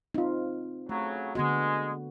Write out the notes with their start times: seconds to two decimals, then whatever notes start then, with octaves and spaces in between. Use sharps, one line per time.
0.15 C4 D#4 F4
0.89 C#3 F#3 A3
1.35 D3 G#3 B3 F#4